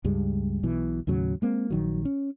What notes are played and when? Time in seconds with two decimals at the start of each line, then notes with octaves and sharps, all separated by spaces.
0.04 C#2 G2 G3 G#3
0.63 B1 B2 E3
1.07 D#2 A2 C#3 F#3
1.42 G#3 A#3 C4
1.70 A#1 D#3 F#3
2.05 C#4